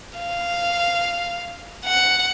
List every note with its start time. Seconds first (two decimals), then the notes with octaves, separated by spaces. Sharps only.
0.18 F5
1.85 F#5